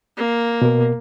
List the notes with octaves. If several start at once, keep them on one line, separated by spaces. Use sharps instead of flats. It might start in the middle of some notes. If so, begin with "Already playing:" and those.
A#3
B2 A#4